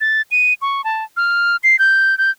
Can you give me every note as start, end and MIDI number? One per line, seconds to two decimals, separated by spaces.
0.01 0.22 93
0.31 0.54 99
0.62 0.84 85
0.84 1.04 81
1.17 1.56 89
1.64 1.78 96
1.79 2.17 91
2.18 2.30 91